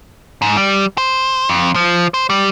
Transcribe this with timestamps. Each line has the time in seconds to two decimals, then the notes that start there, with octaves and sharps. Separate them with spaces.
0.42 G#2
0.57 G3
0.98 C5
1.50 F2
1.76 F3
2.14 C5
2.30 G3